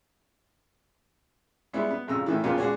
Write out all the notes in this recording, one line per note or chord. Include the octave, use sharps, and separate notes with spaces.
G3 G#3 B3 E4 C#5
B3
G#1 F2 C#3 A#5 E6
A2 D#3 E3
D#2 A#2 C#3 F3 A#3 B3
G#3 C#4 D4 F#4 G#4 C#5